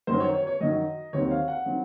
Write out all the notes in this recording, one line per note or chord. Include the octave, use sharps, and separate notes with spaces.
F#2 D#3 F#3 C5
C#5
C#5
C#5
F#2 D#3 F#3 D#5
D#2 D#3 F#3 C4 C#5
F5
F#5
D#3 F#3 C4